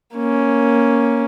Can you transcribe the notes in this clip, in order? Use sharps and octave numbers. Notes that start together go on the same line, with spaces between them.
A#3 C#4